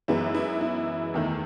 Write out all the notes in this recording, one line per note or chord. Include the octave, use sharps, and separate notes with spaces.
F#2 E3 G#3 B3 E4
E4
E4
E2 D#3 A3